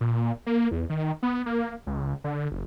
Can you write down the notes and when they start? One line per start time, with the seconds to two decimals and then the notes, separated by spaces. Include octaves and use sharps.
0.01 A#2
0.46 A#3
0.71 E2
0.90 D#3
1.23 B3
1.46 A#3
1.87 C#2
2.24 D3
2.51 F#1